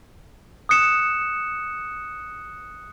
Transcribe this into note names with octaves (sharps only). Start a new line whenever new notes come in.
D#6 F#6 C#7 E7